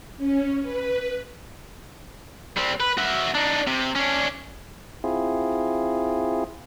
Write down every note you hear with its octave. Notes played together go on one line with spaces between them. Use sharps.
C#4
B4
G3 C4
B4
F#4 E5
D4 D#4
C3
C#4 D4
C4 E4 F4 G#4